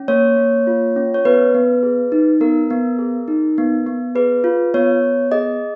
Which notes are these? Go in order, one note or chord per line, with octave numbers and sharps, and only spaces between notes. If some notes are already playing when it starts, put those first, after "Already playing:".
Already playing: C#4
A#3 C#5
A#3
F4
C#4
C#5
B3 B4
B3
G#4
D#4
B3 A#4
B3
G#4
D#4
B3
B3
G#4 B4
F4
B3 C#5
B3
G#4 D#5